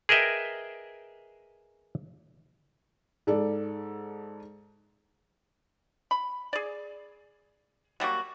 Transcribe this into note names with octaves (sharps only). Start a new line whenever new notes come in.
G#4 A#4 B4 D#5 E5 G5
G#2 A4 D5
B5
G#4 D5
F#3 G3 A#3 F#4